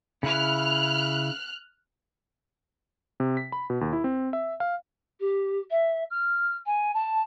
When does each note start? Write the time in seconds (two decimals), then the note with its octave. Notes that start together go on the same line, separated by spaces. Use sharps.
0.23 C#3 E4 F6 F#6
3.20 C3
3.37 B6
3.52 B5
3.70 B2
3.81 D#2
3.93 E4
4.04 C4
4.33 E5
4.60 F5
5.19 G4
5.70 E5
6.10 F6
6.65 G#5
6.93 A5